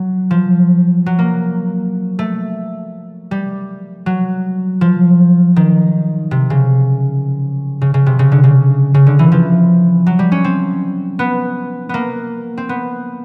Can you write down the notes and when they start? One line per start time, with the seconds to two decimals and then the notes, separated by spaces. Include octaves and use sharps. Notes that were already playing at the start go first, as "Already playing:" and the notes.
Already playing: F#3
0.31 F3
1.06 F#3
1.19 A#3
2.19 A3
3.31 G3
4.06 F#3
4.81 F3
5.56 D#3
6.31 C3
6.50 C#3
7.81 C#3
7.94 C#3
8.06 C3
8.19 C#3
8.32 D3
8.44 C#3
8.94 C#3
9.07 D3
9.19 E3
9.32 F3
10.06 F#3
10.19 G3
10.32 C#4
10.44 C4
11.19 B3
11.89 A#3 B3
12.57 C4
12.69 B3